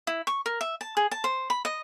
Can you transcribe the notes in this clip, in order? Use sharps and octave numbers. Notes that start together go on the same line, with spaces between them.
E4
C#6
A#4
E5
A5
G#4
A5
C5
B5
D#5